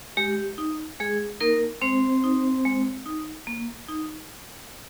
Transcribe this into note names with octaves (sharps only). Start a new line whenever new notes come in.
G#3 G4
D#4
G#3 G#4
A#3 D#4 A#4
G#3 C4 C5
D#4
G#3
D#4
A#3
D#4